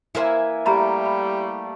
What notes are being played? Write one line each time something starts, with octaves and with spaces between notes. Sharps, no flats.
E3 A#3 E4 A#4 C5 G#5
G3 A3 A#3 G4 A#5 B5
B5